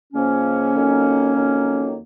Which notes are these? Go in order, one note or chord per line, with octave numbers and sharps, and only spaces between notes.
C#2 C#3 F3 A#3 C#4
F2 D#3 F#3
F2 D#3 F#3